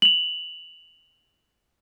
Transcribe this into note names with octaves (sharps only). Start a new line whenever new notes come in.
F7 F#7